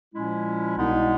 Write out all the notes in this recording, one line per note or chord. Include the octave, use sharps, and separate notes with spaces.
A#2 F3 G#3 C#4 E4
C2 B2 G#3 B3 D#4